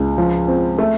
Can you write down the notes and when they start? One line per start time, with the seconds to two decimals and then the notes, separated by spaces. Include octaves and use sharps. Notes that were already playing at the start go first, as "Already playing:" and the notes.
Already playing: C#2
0.18 F3
0.48 C4
0.79 A3